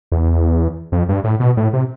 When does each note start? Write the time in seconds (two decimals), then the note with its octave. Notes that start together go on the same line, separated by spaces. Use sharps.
0.12 E2
0.92 F2
1.09 G2
1.24 A2
1.40 B2
1.57 A2
1.73 C3